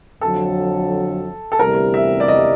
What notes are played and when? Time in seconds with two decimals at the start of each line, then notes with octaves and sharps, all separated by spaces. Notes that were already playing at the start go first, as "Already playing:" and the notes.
0.21 F2 D3 F#3 A4
1.52 A4
1.59 D2 C3 E3 G3 B3 A#4
1.94 E5
2.20 D5
2.28 D#5